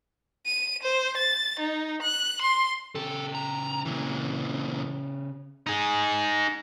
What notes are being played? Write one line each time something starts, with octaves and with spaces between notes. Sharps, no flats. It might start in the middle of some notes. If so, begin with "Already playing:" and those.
D#7
C5
A6
D#4
F#6
C6
C#3 G4 A4
A#5
A#2 E3
D#4 G#4